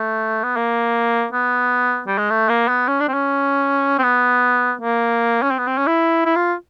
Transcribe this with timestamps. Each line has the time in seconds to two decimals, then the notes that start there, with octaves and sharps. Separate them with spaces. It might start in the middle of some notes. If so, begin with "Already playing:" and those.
Already playing: A3
0.44 B3
0.56 A#3
1.33 B3
2.07 G3
2.18 G#3
2.30 A3
2.49 A#3
2.68 B3
2.88 C#4
3.00 D4
3.08 C4
3.13 C#4
3.99 C4
4.04 B3
4.81 A#3
5.42 C#4
5.50 C4
5.58 B3
5.68 C4
5.77 C#4
5.87 E4
6.25 E4
6.36 F4